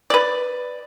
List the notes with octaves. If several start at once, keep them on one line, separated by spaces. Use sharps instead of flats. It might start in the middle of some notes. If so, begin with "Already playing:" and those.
B4 D5